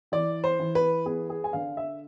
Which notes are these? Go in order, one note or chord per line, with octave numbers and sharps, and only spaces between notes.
E3 D5
C5
E3
B4
B3 G#4
G#4
G#5
D3 F5
E5